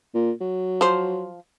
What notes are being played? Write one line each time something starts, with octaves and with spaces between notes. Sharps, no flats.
A#2
F#3
F3 C5